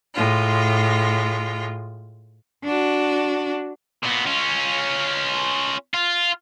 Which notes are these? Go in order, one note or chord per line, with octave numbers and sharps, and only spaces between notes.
A2 G#3 F4
D4 F#4
A#2 B3
C#4 F4
F4